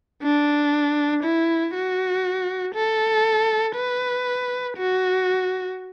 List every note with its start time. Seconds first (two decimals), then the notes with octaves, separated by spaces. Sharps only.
0.23 D4
1.24 E4
1.74 F#4
2.75 A4
3.76 B4
4.77 F#4